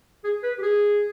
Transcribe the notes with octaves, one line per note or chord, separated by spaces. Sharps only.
G#4
B4
G4
G#4